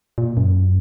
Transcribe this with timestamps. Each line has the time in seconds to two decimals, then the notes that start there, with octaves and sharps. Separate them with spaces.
0.18 A#2
0.37 F#2